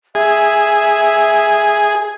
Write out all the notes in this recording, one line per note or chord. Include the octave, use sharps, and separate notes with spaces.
G#4 E5